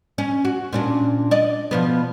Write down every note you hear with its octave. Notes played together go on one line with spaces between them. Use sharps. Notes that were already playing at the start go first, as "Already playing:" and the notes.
C#4
F#4
A#2 C#4 D4
D5 D#5
B2 F3 B3